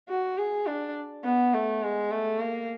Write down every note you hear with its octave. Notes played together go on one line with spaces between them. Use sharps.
F#4
G#4
D4
B3
A3
G#3
A3
A#3